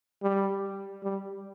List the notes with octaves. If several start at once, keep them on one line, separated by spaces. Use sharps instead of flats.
G3
G3